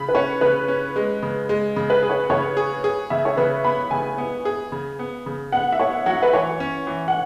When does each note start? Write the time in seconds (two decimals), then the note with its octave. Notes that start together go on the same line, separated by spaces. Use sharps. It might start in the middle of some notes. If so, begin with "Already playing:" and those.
Already playing: C#3 B5
0.09 B4
0.15 C#4 C#5
0.41 C#3 B4
0.68 C#4
0.96 G#3
1.23 C#3
1.49 G#3
1.76 C#3
1.90 B4
2.02 G#4
2.09 C#5
2.30 C#3 C#5
2.57 G#4
2.84 G#4
3.10 C#3 E5
3.25 C#5
3.37 C#3 B4
3.64 B3 B5
3.91 C#3 G#5
4.18 B3
4.45 G#4
4.72 C#3
4.99 B3
5.26 C#3
5.52 B3 F#5
5.72 E5
5.80 B3 C#5
6.06 F#3 F#5
6.23 B4
6.33 E3 C#5
6.60 C#4
6.87 E3
7.08 F#5